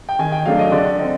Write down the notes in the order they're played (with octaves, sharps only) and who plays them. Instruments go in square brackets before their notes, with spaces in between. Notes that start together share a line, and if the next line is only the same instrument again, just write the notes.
[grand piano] G5
D#3 G#5
G5
F#3 A3 D4 F5
D#5
D3 D5
C4 D#4